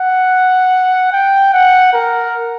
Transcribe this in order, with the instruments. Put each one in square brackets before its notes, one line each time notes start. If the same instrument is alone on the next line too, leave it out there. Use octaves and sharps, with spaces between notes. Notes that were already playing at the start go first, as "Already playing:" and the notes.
Already playing: [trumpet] F#5
G5
F#5
A#4